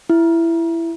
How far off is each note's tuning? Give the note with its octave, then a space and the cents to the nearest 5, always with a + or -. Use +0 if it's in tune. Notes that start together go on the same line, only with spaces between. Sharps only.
E4 +15